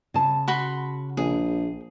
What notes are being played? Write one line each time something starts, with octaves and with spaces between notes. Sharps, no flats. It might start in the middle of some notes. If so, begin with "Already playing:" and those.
C#3 A5
F#4 B5 C6
A#1 G#4